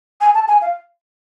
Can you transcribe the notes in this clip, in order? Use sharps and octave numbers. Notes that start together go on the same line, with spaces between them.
G#5
A5
G#5
F5